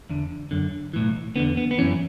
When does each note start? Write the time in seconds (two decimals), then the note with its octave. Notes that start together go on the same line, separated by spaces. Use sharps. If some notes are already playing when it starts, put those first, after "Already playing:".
0.09 E2 D3
0.51 F#2 D3
0.94 B1 A2 E3
1.36 E2 D3 B3
1.57 B3
1.71 B3
1.78 F#2 E3 C#4